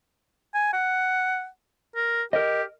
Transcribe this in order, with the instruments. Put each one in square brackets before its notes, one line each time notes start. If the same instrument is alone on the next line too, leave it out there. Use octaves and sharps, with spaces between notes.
[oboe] G#5
F#5
A#4
[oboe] G4 [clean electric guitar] A#4 D#5